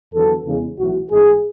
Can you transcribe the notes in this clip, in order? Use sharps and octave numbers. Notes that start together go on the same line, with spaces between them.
E2 D3 F#3 B3 A4
E2 C#3 G#3
B1 A2 E3 F#4
A1 G#2 G#3 G#4